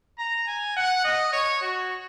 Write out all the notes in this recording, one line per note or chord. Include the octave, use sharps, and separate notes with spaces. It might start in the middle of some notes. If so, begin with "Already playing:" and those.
A#5
G#5
F#5
D#5
C#5
F#4